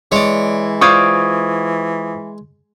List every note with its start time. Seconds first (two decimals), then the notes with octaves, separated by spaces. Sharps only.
0.12 E3 G#3 C#5 D5
0.81 F4 C5 D5 C#6 D#6 G#6